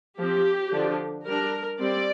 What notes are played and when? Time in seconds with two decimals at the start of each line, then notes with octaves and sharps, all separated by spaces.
0.18 F3 C4 G4
0.72 D3 F3 D4
1.26 G3 D4 A#4
1.80 G3 C4 D5